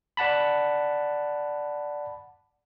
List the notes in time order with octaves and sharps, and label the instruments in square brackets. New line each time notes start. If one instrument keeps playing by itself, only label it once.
[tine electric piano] D5 F#5 A5 B5